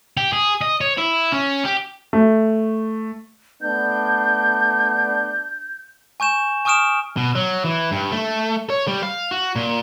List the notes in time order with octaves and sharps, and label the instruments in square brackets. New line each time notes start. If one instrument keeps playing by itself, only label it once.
[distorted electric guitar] G4
G#4
D#5
C#5
E4
C#4
G4
[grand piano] A3
[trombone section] A3 B3 D4 [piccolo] G6
[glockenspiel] G#5 C#6 G6 E7
G#5 C#6 D#6 F6 D7 E7
[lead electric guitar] B2
F#3
E3
G2
A3
C#5
G3
F5
F#4
A#2